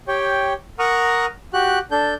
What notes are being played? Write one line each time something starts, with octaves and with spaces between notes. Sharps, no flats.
G4 C#5 G5
A#4 F#5 A#5 C#6 D#6 F6
F#4 G4 F#6
D4 A4 G6